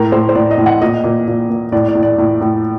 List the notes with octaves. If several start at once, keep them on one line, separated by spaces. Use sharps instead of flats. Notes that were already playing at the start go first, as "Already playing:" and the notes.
Already playing: A2 A#4
A2 C5
C5
A2 D5
D#5
A2
F#5
A#2 D#5
A#2
A#2
A#2
A2 D5
D5
A2
D5
A2
A2